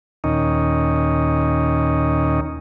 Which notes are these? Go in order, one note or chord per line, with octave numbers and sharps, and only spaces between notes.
D#2 A#2 D#3 C#4 D#4